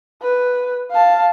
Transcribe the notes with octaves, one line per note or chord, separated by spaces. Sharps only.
B4
F5 A5